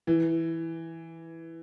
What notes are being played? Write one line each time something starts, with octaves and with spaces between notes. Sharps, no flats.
E3